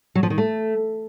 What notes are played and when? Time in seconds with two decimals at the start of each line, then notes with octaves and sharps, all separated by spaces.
0.15 F#3
0.23 F3
0.30 D#3
0.38 A3